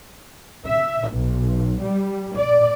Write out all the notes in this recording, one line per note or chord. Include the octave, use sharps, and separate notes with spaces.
E5
B1
G3
D5